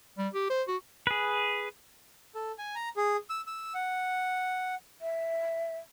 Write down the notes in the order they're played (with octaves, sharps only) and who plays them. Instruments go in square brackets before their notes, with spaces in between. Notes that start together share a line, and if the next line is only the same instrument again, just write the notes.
[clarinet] G3
G4
C5
F#4
[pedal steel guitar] G#4 B4
[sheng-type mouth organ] A4
G#5
A#5
G#4
E6
E6
F#5
[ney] E5